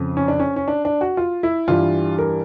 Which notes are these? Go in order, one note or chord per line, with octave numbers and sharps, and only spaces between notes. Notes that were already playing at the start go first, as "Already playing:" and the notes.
Already playing: F2 C#3 F3
C#4
D4
C#4
C#4
D4
D4
F#4
F4
E4
G2 E3 G3 F4
A#4